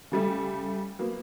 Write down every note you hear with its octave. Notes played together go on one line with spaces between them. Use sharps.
C#3 G3 A3
F#3 A#3 B3